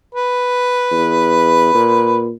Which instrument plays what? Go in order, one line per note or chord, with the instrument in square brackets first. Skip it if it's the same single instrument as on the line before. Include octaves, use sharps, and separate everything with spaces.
[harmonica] B4
[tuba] E2
A#2